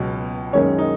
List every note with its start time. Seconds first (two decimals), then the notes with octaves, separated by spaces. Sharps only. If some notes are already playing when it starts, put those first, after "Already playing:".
Already playing: C#2 B2 F#3
0.53 F#2 D#3 G#3 C#4 C#5
0.78 D#4